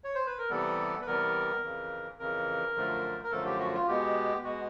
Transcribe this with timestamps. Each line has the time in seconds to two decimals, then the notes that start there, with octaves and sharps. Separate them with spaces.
0.04 C#5
0.15 C5
0.27 B4
0.38 A#4
0.50 C3 E3 G3 B3 A4
1.02 B4
1.06 C3 E3 G3 B3 A#4
1.62 F2 C#3 E3
2.19 F2 C#3 E3 A#4
2.75 F#2 D3 F3 A3
3.24 A#4
3.31 F#2 D3 F3 A3 A4
3.46 G4
3.59 F#4
3.74 F4
3.88 B2 G#3 B3 G4
4.44 B2 G#3 B3 F#4